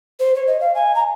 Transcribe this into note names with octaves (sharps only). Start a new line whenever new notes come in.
C5
C#5
D#5
F5
G#5
A#5